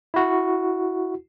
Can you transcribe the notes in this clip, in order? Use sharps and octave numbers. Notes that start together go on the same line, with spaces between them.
E4 F#4